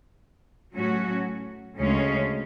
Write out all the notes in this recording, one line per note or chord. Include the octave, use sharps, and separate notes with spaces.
A2 F#3 C#4 F#4
D2 C#3 G#3 C#4